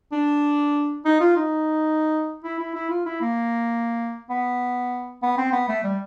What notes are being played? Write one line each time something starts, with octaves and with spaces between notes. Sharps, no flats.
D4
D#4
F4
D#4
E4
E4
E4
F4
E4
A#3
B3
B3
C4
B3
A3
G3